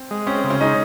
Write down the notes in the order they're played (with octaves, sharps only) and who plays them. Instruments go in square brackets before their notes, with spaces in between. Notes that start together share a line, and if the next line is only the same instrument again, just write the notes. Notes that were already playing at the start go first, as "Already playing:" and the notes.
Already playing: [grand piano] C4
[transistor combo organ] G#3
[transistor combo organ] C4 [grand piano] C#4
[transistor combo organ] C#3
[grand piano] C#4
[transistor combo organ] G#3 [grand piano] D#4